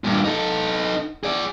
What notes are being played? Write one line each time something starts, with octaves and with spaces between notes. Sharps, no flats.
G2 A#2
D#4 A4
G#4 D5